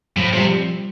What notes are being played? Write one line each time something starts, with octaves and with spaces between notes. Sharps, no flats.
A2 F3
C3 F3
G3